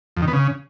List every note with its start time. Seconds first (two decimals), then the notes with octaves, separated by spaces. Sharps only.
0.17 F2
0.22 D#3
0.28 B3
0.33 C#3